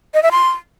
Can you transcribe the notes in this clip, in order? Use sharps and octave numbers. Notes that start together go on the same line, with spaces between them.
D#5
E5
C6